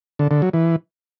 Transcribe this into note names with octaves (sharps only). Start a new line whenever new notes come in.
D3
D3
F#3
E3